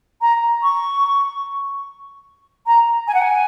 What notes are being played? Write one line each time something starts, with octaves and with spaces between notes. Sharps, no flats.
A#5
C#6
A#5
G#5
F#5
G#5